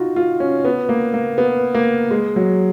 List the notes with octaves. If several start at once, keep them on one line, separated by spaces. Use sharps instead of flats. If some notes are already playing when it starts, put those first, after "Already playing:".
Already playing: D#4 F4 F#4
F4
C#4
B3
A#3
A#3
B3
A#3
G#3
F#3